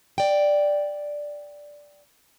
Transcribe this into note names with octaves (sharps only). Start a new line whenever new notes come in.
D5 G5